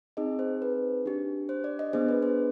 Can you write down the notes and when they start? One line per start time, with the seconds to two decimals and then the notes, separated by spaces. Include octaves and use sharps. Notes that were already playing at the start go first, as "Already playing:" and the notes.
0.17 C4 D#4 G#4 D#5
0.39 C5
0.62 B4
1.06 D4 G4
1.49 C5
1.64 D5
1.79 D#5
1.93 B3 D4 G#4 C5
2.09 B4
2.22 C5